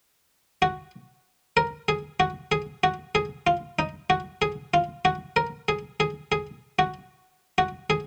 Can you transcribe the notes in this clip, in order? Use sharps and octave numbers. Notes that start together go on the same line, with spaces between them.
F#4
A#4
G#4
F#4
G#4
F#4
G#4
F4
D#4
F#4
G#4
F4
F#4
A#4
G#4
G#4
G#4
F#4
F#4
G#4